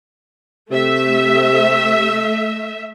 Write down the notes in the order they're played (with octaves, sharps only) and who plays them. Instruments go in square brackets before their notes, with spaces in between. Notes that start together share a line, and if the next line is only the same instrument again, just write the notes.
[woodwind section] C3 [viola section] A3 E5